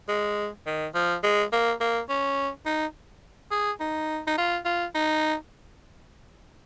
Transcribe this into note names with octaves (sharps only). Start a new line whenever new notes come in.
G#3
D#3
F3
G#3
A#3
A#3
C#4
D#4
G#4
D#4
D#4
F4
F4
D#4